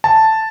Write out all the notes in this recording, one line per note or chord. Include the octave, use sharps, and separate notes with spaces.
A5